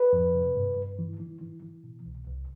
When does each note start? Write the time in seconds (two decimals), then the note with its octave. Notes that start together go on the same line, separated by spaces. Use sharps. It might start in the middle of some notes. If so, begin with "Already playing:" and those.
Already playing: B4
0.13 F2
0.35 C3
0.56 G2
0.77 G2
0.99 E3
1.20 E3
1.41 E3
1.63 E3
1.84 B2
2.06 C2
2.27 C2